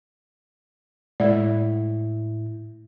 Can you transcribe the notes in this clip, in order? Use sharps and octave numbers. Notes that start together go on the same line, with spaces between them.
A2 G#3 E4 D5